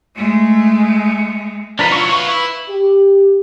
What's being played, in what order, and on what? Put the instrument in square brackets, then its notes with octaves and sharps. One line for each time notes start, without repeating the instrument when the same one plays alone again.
[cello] G#3 A3
[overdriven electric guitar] F3 D#4 [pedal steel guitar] D4 A#4 B4
[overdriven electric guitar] F#3 E4 [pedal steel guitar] F4 C#6
[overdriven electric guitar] F4 B4 [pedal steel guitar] C#6
[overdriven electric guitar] E4 [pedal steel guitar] B4
[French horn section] G4